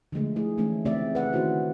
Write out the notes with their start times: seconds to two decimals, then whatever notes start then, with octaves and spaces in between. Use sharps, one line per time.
0.12 D3 F3 G#3 A3
0.36 A3 E4 G#4
0.58 E3 A3 C#4 D#4
0.85 C#3 A3 C4 G4 D5 E5
1.15 B4 F#5
1.33 D#3 C#4 E4 F#4 C5